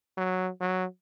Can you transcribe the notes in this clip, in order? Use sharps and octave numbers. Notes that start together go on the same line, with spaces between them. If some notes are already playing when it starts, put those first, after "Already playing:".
F#3
F#3